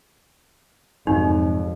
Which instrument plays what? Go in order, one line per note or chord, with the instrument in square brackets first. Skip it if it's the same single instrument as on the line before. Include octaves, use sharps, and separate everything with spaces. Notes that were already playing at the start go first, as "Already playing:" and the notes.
[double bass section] F2 [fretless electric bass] G#2 C3 F#3 [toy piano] D#4